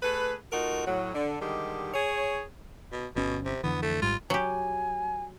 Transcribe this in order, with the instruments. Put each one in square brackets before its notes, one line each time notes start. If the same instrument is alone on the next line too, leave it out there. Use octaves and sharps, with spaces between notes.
[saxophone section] A3 G#4 B4
A3 D#4 F4 F#4 A#4
A2 F#3
D3
D3 D#3 G3 G#3 G4
G#4 C#5
[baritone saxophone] B2
[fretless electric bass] G1 C#4 [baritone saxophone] B2
[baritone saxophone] C3
[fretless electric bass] F2 D3 E3 [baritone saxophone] B3
[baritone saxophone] A3
[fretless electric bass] G#1 G#2 G3 [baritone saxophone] F4
[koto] F#3 G4 [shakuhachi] G#5